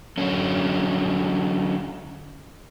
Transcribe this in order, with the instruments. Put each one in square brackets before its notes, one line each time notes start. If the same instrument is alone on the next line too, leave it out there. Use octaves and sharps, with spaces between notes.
[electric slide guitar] D3 F#3 C#4